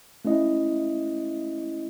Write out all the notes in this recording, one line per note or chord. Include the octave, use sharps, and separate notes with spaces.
A3 C#4 E4 D#5